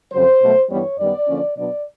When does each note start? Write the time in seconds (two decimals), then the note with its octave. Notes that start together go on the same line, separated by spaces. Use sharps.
0.11 F2 C#3 F#3 C5
0.41 B2 F#3 A3
0.70 G2 E3 G3 B3 C#5
0.99 F#2 D#3 G3 B3 D5
1.28 D3 F3 A#3 C#4
1.57 B2 F#3 B3 D4 D5